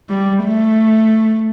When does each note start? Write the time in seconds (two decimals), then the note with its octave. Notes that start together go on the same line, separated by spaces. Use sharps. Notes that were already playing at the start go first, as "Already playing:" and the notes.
0.10 G3
0.44 A3